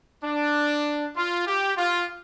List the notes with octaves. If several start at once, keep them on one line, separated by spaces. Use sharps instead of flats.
D4
F4
G4
F4